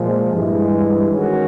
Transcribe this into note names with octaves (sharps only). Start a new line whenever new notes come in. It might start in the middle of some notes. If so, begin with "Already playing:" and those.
Already playing: A#2 F3 G#3
G2 E3 G#3
D#3 G#3 C#4 F#4 A#4